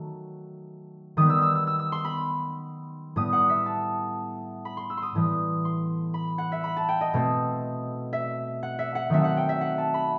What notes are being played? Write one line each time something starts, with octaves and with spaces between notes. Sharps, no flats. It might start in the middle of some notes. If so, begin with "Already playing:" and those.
Already playing: D#3 F#3 A3
D#3 G3 B3 D#6
E6
E6
E6
E6
E6
C6
B5
A2 G3 B3 D#6
F#5
E5
A5
B5
C6
E6
C6 D#6
A2 E3 G3 B3
C6
B5
F#5
E5
B5
A5
G5
D#5
B2 A3 C4
E5
F#5
E5
F#5
D#3 F#3 A3 C4 E5
F#5
G5
E5
F#5
A5
B5